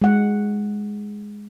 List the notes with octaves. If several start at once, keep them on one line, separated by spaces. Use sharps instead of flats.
G#3 F#5